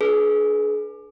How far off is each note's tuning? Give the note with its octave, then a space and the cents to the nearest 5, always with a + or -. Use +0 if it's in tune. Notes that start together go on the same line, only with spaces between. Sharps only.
D4 +0 G#4 +35 B4 -15